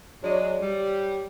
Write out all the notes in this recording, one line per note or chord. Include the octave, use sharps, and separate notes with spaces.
F#3 G#3 D4 C#5 D5 D#7
G3